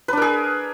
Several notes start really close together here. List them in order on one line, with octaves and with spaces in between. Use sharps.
B4 D4 A#4 G#4